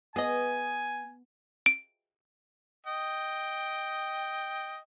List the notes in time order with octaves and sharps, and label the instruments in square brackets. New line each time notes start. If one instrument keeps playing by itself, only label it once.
[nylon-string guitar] B3 [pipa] G#4 D#5 [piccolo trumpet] G#5
[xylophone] D7
[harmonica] D#5 G5